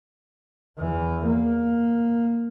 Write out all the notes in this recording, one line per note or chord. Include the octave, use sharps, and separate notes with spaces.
E2 E3
A#3